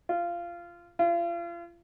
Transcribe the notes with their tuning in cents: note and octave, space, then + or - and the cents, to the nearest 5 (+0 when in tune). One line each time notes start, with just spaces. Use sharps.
F4 -15
F4 -35